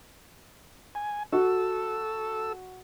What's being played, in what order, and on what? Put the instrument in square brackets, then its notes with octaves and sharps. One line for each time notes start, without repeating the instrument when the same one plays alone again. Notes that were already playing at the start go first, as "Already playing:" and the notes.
[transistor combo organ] G#5
[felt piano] F#4 [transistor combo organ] A4 E6